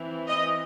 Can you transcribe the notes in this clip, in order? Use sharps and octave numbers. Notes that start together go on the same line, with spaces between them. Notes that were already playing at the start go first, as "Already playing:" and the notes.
Already playing: E3 C4
D#5